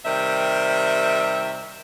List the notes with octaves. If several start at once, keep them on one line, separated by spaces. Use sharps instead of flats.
C3 D#3 G3 E5